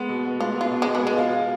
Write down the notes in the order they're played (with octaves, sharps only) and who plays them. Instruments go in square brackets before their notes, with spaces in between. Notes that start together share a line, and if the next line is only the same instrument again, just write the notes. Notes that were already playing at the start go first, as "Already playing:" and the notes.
Already playing: [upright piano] G#3 B3
B2
B3
[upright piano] G#3 [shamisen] F4
[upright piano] B2 [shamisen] F4
[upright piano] B2
[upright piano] B2 [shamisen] G#3
[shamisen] B3
[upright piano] B2 [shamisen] G#3
[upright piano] F4
F4